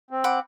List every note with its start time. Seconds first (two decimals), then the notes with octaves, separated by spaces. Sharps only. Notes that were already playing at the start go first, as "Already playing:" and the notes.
0.11 C4
0.24 F#5 B5 D6